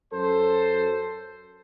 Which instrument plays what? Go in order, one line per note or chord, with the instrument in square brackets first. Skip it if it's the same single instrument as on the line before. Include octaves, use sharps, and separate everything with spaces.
[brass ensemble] F#2 A4 C5